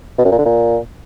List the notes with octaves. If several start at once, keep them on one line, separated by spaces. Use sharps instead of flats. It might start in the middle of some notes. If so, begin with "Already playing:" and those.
B2
F#2
A#2
D3
A#2